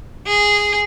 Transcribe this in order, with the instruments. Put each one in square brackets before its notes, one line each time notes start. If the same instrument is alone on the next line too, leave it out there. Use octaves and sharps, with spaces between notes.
[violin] G#4